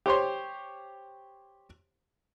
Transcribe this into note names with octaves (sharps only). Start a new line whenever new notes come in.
G4 C5 C#5 C6